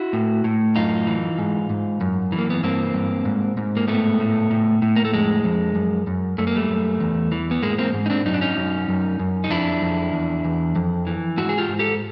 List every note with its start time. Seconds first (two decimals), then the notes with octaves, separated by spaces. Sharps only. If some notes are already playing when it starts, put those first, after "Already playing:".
Already playing: E4 F#4
0.13 A2
0.44 A2
0.76 F#2 D#4 F4
1.07 E3
1.38 G#2
1.70 G#2
2.01 F#2
2.32 E3
2.38 A#3
2.50 B3
2.63 G2 A#3 C4
2.94 G2
3.25 G#2
3.57 G#2
3.76 A#3
3.88 A2 A3 B3
4.20 A2
4.51 A2
4.82 A2
4.96 A#3
5.05 A3
5.13 F2 G#3
5.44 F2
5.75 F#2
6.07 F#2
6.38 F#2 A3
6.47 A#3
6.56 G3 A3
6.69 F#2
7.01 E2
7.32 E3
7.51 B3
7.63 G#2 G#3 A#3
7.78 A#3 C4
7.94 G#2
8.06 D#4
8.10 C4 D4
8.25 F#2 D#4
8.34 D4
8.41 C#4 D#4
8.57 F#2
8.89 F#2
9.19 F#2
9.44 D#4
9.50 F2 D4 E4
9.82 F2
10.13 E2
10.45 E2
10.76 F2
11.07 E3
11.37 G#2 E4 F#4
11.49 G#4
11.58 F4 G4
11.69 G#2
11.79 G4 A4